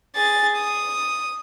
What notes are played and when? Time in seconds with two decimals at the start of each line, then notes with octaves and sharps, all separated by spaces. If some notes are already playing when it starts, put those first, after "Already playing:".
0.16 G#4 A6
0.57 D#6